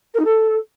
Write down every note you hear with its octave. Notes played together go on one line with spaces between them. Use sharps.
A#4
D#4
A4